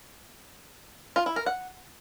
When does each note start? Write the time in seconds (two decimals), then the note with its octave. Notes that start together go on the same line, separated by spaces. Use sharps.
1.16 F4
1.26 E4
1.36 A#4
1.46 F#5